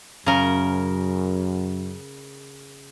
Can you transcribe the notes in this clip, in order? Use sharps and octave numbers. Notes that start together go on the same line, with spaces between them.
F#2 C#3 A#4